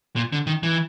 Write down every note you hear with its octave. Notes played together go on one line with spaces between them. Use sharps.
A#2
D3
D#3
E3